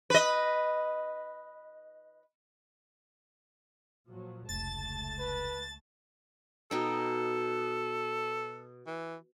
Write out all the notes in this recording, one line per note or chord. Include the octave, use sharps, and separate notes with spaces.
B4 D#5
A#2 F3 F#3
F1 C#2 A3 E4 A5 A6
B4
B2 D#4 A4 G5
E3